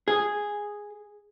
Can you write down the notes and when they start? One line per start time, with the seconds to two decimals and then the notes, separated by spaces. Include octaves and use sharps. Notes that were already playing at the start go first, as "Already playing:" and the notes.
0.08 G#4